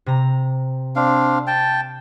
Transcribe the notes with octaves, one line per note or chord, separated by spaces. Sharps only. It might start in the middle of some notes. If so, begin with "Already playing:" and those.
C3 A#5
C4 D4 F5
G5 A5